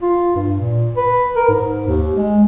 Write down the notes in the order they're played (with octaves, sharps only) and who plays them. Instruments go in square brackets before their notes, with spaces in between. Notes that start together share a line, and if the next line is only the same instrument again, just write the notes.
[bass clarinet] F4
G2
A#2
B4
A#4
G#2
D#2
G#3